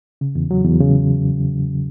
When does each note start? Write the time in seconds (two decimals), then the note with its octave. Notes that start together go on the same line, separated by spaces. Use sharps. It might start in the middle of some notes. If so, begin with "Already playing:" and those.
0.21 C#3
0.35 E2
0.51 F#3
0.65 E2
0.80 C#3